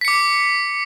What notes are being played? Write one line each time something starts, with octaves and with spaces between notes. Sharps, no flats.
D6 B6 C#7